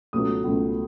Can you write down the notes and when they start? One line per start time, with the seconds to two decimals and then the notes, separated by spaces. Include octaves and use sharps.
0.13 C#2 B2 F#3 A3 D#6
0.44 C#2 B2 F#3 A3